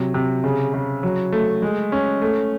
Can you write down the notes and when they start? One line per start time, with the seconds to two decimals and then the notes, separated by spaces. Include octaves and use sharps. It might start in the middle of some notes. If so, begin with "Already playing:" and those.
Already playing: C3 F#3
0.14 C3
0.44 C#3
0.74 C#3
1.03 F#3
1.32 A3
1.62 G#3
1.92 C#4
2.22 A3